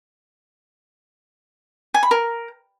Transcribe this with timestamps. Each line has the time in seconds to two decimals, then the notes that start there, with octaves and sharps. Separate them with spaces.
1.94 G#5
2.03 B5
2.11 A#4